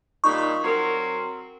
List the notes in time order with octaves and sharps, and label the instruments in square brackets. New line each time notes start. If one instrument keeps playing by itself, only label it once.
[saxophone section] A#2 G3 D#4 [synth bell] C#6
[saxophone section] F#3 C4 A#4